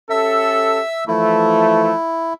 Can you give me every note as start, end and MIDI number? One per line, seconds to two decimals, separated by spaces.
0.10 0.81 61
0.10 0.81 67
0.10 0.81 69
0.10 1.04 76
0.10 1.04 88
1.08 1.92 52
1.08 1.92 53
1.08 1.92 57
1.08 2.33 64